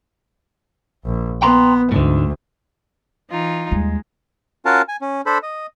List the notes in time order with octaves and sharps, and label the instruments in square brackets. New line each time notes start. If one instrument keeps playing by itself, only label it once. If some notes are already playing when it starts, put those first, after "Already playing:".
[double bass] A#1
[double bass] B3 [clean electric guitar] G5 A#5 C6
[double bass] D2 [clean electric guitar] G#2 D3
[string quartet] E3 D#4 F4
[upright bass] D#2 G3 [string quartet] G#3
[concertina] C#4 F4 F#4 A#4 F5 A5
G#5
C#4
D4 A4 C5 B5
D#5